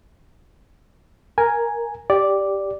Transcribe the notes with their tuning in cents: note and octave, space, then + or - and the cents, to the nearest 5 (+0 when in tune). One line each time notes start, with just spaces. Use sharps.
A#4 +0 G#5 +0
G4 +0 D5 +0